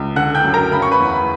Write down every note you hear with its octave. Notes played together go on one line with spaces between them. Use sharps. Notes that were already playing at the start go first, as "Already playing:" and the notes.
Already playing: C#2
D3 F#5 F#6
G5 G6
F#2
A#4 A#5
C#3 B5
C#6
B4 B5
E2